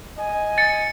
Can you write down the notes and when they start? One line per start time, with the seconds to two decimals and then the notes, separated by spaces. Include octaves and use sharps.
0.17 D#5 G#5
0.58 A6 C#7